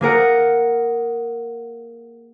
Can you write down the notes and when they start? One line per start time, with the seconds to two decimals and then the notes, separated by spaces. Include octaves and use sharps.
0.01 A#3 G#4 A#4 F#5